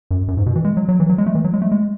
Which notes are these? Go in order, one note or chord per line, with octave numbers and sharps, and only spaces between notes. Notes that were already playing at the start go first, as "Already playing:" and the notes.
F#2
F#2
G#2
B2
E3
G#3
F#3
F#3
E3
F#3
G#3
A3
E3
F#3
G#3
A3
G#3